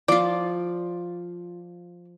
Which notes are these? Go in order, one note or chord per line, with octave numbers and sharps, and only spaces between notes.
F3 F4 D5